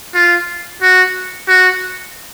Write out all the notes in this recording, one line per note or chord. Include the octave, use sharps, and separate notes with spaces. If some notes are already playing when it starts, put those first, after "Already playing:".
F4
F#4
F#4